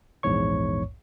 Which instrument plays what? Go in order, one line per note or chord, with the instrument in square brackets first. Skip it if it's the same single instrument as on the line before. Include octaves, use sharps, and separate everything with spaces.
[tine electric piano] A#1 E2 G#2 C#5 C#6